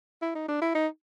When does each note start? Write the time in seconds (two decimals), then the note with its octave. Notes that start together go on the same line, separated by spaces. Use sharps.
0.22 E4
0.35 D#4
0.48 D4
0.62 E4
0.75 D#4